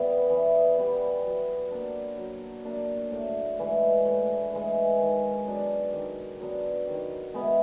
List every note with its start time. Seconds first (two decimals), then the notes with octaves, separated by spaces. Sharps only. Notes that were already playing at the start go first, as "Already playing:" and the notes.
Already playing: E3 G3 B3
0.30 E3
0.78 G3 B3
1.24 F#3
1.71 A#3 D4
2.18 F#3
2.65 A#3 D4
3.11 A2
3.59 E3 G#3
4.05 A2
4.53 E3 G#3
4.99 D#3
5.46 F#3 B3 D4
5.93 D#3
6.40 F#3 B3 D4
6.87 D#3
7.34 G#3 B3 E4